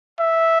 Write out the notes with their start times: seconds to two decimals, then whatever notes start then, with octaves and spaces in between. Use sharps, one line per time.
0.19 E5